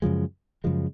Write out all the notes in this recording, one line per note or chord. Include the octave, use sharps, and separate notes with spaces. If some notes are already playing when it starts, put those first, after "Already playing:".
F#2 C#3 F3 G#3
F#2 C#3 F3 G#3